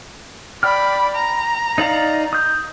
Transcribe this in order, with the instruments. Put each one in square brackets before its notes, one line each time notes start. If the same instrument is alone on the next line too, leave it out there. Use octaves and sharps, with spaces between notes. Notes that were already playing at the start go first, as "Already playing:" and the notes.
[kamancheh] D5 B5 [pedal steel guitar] G5 F6
[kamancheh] A#5
[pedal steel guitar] D#4 D5 F5
D#6 G6